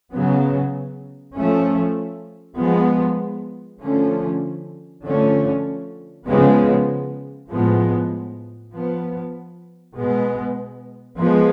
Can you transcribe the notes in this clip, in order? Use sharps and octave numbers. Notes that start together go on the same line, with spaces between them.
C#3 F#3 B3
F3 A3 C#4
F3 G#3 B3
D3 F3 A3 C#4
D3 F3 A3 C#4
C#3 F3 G#3 B3
A2 F3 G#3 B3
F3 B3
B2 G#3 B3
F3 G#3 B3